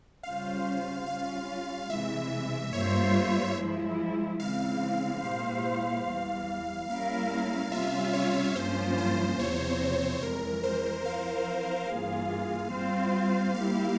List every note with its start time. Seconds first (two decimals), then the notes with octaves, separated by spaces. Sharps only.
0.23 C#3 G3 C#4 F4 C5 F5
1.07 G3 C#4 F4 F5
1.90 C3 E3 G#3 E5
2.73 G2 G3 A#3 F4 C5 C#5
3.57 F3 G#3 E4
4.40 C#3 E3 G#3 C4 E4 F5
5.22 A#2 G#3 E4 G4 C5 F5
6.06 E2 E3 G3
6.89 G3 A#3 C#4 E4 A#4 F5
7.72 C3 G3 C#4 F4 E5
8.14 C#5
8.55 G2 F3 A#3 C#4 F4 C5
8.98 C5
9.39 E2 C3 F3 C4 C#5
10.22 F2 E3 G#3 A#4
10.63 C5
11.05 F3 C4 E4 F5
11.88 G2 E3 A#3 F4 G#4
12.72 G3 C4 F4 C5
13.55 G3 A#3 E4 G4 F5